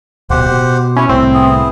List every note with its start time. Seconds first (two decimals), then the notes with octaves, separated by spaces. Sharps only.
0.30 D1 B2 G4 C5 F#5
0.51 B2
0.97 C#4 E4
1.09 C2 A2 C4 E5
1.34 B3 E4 G#4